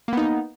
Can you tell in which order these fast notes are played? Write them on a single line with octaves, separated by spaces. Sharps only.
A#3 B3 D#4